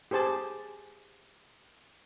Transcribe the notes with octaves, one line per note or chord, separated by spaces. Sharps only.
G4 G#4 C5 A5